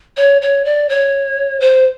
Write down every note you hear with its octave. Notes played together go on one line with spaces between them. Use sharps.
C#5
C#5
D5
C#5
C5